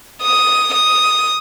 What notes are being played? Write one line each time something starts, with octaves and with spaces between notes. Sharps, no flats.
D#6
D#6